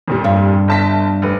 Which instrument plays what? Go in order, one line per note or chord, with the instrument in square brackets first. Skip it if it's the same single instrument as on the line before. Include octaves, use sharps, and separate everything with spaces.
[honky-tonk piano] F2 A#2 G3
[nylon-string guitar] G2
[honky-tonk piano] G1 A5 B6
F1 B4